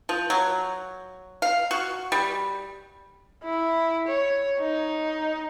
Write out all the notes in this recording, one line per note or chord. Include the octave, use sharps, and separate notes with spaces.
F3
F#3
F5
F#4
G3
E4
C#5
D#4